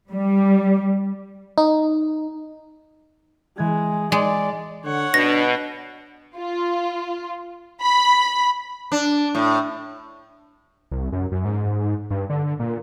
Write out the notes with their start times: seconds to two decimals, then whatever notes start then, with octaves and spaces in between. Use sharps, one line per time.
0.11 G3
1.58 D#4
3.58 E3 G#3 G#6
4.12 G#3 D5
4.85 D3 C#5 F#5
5.14 B2 D4 A#6
6.38 F4
7.81 B5
8.92 D4
9.35 A2
10.91 C2
11.12 F#2
11.32 F#2
11.45 G#2
12.10 G2
12.30 D3
12.59 A#2